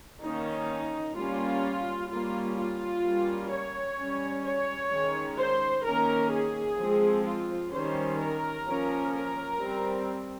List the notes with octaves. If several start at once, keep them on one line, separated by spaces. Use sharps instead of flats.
D#3 A#3 C#4 D#4
G3 A#3 C#4 F4
G3 A#3 C#4 F4
F4
G3 A#3 C#4
C#5
G3 C#4
C#5
D#3 G#3 C#4
C5
D#3 A#3 C#4 A#4
G#4
F3 G#3 C4
F4
D#3 G3 C#4 C5
A#4
F3 A#3 C#4
A#4
G3 C4